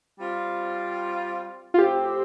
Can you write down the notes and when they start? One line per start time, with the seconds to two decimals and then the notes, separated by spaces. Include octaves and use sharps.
0.18 G3 C4 F4
1.74 F4
1.78 A2 F3 C4 G4